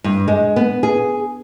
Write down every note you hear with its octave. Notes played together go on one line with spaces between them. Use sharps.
G2
G#3
B3
G#4